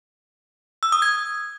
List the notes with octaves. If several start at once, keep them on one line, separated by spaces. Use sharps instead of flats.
E6
D#6
G#6